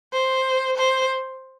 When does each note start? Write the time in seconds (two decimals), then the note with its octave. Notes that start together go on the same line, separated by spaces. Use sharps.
0.13 C5
0.77 C5